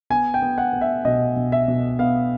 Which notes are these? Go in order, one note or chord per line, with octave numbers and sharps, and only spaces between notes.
B3 G#5
G5
B3
F#5
B3
E5
B2 D#5
B2
E5
B2
B3 F5